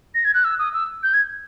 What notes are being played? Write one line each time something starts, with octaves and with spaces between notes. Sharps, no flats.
A#6
G#6
F#6
E6
D#6
E6
G6
G#6